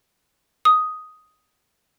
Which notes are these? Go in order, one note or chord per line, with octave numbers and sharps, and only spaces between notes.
D#6